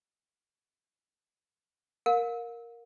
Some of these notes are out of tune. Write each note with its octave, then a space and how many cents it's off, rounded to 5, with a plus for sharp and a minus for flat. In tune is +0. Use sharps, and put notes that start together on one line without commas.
A#4 +0 F5 +35